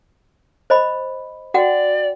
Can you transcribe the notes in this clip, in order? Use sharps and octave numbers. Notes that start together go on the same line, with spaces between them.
C5 D#5 B5
F#4 D5 F#5 G5